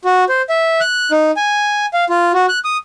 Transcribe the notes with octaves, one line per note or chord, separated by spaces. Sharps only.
F#4
C5
E5
F#6
D#4
G#5
F5
F4
F#4
F#6
D#6